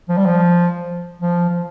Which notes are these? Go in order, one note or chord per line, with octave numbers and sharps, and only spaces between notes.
F3
G3
F3
F3
F3